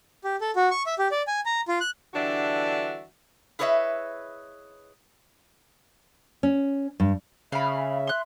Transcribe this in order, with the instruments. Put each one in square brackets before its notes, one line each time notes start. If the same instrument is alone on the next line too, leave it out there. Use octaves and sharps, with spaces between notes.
[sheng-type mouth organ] G4
A4
F#4
C#6
E5
G4
D5
G#5
A#5
F4
F#6
[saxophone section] D3 E3 G3 D4 F#4 E5
[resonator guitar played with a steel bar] E4 G#4 B4 C#5 D#5 E5
[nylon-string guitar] C#4
G2
[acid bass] C#3 [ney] E5 [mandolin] F5 B5
[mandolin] C6 F#6